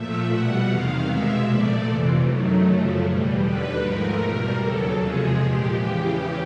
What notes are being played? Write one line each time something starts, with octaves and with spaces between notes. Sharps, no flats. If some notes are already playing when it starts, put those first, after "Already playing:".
Already playing: A#2 F3 A3 E5
B2 G3 F#5
E2 C3 D#3 F5
B2 G#3 E5
A#2 F3 A3 D5
F2 C3 E3
F#2 D#3 F#3 A3
F#2 C#3 F3 A3
E2 B2 G3
D#2 D3 G3 B4
G#2 F3 A3 A#4
E2 B2 G3
D#2 C#3 F#3 A4
E2 C3 F3 G#3 G#4
A#2 F3 G#3 G4
E2 C#3 E3 G4